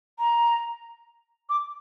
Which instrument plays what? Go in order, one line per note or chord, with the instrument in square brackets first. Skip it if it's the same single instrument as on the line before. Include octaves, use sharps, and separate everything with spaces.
[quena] A#5
D6